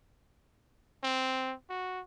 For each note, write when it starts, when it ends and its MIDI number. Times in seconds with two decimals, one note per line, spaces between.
1.03 1.54 60
1.70 2.01 66